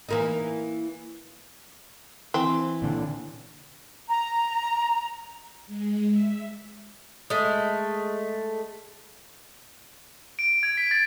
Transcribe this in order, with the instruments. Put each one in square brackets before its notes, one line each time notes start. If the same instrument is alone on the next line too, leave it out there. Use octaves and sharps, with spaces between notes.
[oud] E3 A#3 D#4
[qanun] E3 D6 [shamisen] C4
[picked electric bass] A#2 D3
[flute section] A#5
[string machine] G#3
E5
[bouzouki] G#3 A3
[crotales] D7
G#6
B6
A6